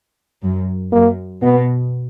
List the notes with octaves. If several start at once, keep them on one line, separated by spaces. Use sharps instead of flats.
F#2
F#2 A#3
B2 B3